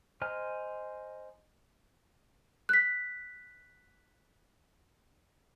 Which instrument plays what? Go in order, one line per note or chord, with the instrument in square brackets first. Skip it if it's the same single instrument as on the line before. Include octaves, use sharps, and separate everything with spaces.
[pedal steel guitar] C5 D#5 G#5 A#5 F6
[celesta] F#6 B6